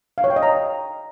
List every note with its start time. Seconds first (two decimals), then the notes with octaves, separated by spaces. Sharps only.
0.18 F5
0.24 C#5
0.30 G5
0.36 D#5
0.43 A#5